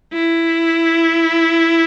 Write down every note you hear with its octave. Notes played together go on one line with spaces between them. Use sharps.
E4